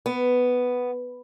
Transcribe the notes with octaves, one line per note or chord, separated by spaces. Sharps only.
B3